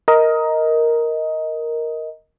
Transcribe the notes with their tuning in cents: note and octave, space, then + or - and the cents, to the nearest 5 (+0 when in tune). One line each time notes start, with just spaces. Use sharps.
A#4 +0 D#5 +15